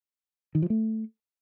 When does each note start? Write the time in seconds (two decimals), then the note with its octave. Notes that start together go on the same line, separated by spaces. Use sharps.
0.55 D#3
0.62 F3
0.70 A3